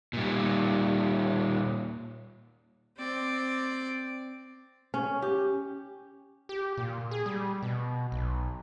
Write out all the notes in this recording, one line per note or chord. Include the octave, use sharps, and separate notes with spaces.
A#2 G3
C4 D5
C#4
G4
G4
A#2
G#4
G3
B2
B1